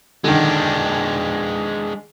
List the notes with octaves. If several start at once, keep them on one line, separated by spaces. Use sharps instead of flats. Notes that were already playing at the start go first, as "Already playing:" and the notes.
D3 D#3 G#3 D4